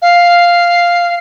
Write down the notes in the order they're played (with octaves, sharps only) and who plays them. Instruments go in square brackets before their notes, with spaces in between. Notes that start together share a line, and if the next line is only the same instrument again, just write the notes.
[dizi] F5